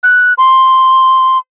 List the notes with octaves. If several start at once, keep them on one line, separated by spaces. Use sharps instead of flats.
F#6
C6